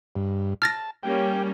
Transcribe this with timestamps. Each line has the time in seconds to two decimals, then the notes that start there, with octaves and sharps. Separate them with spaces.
0.16 G2
0.62 A5 F6 A6 A#6
1.03 G3 A#3 C#4 G5